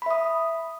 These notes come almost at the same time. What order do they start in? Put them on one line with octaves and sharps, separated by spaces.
B5 E5 D#6